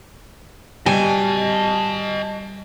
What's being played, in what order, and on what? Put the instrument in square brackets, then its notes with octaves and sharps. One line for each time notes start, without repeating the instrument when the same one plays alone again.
[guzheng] G3 [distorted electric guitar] D#5 A5 [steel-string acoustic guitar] G#5